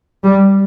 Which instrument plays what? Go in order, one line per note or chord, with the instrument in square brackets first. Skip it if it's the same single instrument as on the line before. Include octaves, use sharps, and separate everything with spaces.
[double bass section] G3